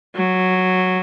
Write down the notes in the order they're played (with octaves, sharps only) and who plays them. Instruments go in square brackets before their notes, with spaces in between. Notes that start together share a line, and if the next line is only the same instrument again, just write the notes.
[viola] F#3